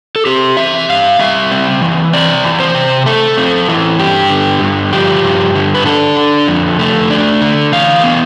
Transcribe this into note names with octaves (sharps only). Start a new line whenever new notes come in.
A4
C4 G4
E3 E5
G2 F5
G3 E5
C4
E3
C4 D5
E3
C5
C3
A3 A4
C4
E3
G2 G4
D3
G2
F3 G4
G2
D3
B4
D4 A4
D3
F2
A3
D4
D3
E3 F5
B3